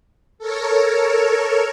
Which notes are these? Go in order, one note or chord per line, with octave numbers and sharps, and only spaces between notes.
A4 A#4 C#5